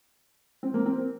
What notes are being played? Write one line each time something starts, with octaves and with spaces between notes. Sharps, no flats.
C4
A#3
C4